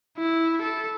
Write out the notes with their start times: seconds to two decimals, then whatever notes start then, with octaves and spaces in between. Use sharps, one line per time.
0.18 E4
0.62 A4